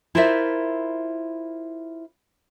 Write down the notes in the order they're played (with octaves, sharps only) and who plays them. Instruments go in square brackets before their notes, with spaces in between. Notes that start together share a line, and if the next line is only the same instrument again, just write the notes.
[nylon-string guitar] E4 F4 A#4 C5 D5 E5